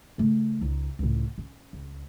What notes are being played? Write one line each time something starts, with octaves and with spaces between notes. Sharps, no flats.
C#3 A3
C#2 D#4
C#2 A2
C#4
C#2